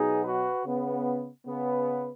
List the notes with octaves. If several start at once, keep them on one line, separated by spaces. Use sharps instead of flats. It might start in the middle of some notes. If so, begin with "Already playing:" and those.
Already playing: B2 F#3 B3 D#4 G#4
F#4 B4
C#3 B3
C#3 B3